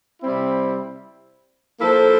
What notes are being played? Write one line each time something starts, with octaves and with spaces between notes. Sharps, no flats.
C3 G3 C4 E4
F3 A#3 E4 A4 C5